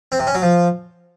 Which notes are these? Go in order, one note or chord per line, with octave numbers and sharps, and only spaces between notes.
C4
C3
C#4
F#3
F3